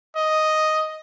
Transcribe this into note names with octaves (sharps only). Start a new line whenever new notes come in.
D#5